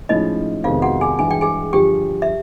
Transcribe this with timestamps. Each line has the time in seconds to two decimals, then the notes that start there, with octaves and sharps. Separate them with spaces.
0.09 A2 F3 G#3 C#4 D#4 E4 D#5
0.64 F2 C3 D#3 G#3 B3 F4 F5
0.82 F#4 F#5
1.01 G#4 G#5
1.19 G2 E3 G#3 G#5
1.31 G5
1.41 G#4 G#5
1.73 G2 D3 F3 G4 G5
2.22 E5